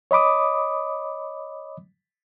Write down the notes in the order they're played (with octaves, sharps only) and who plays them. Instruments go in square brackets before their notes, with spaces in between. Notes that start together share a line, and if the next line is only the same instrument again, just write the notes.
[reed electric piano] C#5 D#5 B5 D6 D#6